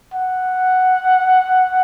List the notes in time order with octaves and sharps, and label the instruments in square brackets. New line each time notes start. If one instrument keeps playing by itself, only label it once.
[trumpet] F#5